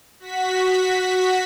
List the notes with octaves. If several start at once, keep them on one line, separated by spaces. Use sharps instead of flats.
F#4 B6